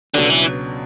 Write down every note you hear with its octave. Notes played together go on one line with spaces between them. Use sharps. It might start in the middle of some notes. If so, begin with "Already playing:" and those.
C#2 B2 D3 F#3 B3 D4
E3